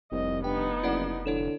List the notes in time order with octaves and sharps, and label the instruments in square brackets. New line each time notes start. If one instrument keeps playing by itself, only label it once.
[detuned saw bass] F1 [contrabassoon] C2 [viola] D#5
[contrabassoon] G2 [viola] B3 D#4 [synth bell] G5
[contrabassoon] F#1 [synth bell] E4 D5 F#5
[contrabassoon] D3 [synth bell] E4 C#5 E7